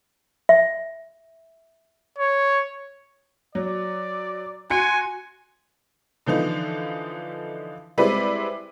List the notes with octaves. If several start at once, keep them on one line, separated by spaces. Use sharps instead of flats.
E5
C#5
F#3 D5
F#4 G#5 C6 C#7
D3 E3 F3 D#4
G3 G#3 C4 E4 B4 D5